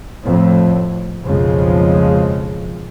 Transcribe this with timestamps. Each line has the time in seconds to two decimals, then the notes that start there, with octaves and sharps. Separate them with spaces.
0.25 F2 A2
1.26 B1 F2 C#3 F3 G#3